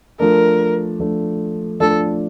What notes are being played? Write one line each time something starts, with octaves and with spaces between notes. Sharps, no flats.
F3 A3 D4 A#4
F3 A3 D4
F3 A3 D4 A4